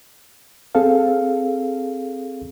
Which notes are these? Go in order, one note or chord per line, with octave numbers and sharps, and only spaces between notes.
C4 G#4 A4 F5